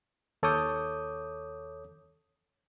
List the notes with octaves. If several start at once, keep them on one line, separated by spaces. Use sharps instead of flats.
D#2 A4 C#5 D6 D#6 G6